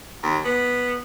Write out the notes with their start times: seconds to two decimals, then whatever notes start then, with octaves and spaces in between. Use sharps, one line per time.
0.23 D#2
0.45 B3